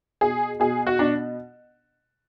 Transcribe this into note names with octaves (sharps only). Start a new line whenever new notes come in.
B2 G#4
B2 G#4
F#4
B2 D4